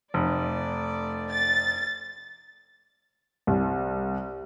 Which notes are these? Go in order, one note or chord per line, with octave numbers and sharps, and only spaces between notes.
F1 A3 D5
A6
C2